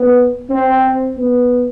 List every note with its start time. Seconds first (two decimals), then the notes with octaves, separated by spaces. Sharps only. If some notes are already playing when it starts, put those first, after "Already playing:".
Already playing: B3
0.50 C4
1.17 B3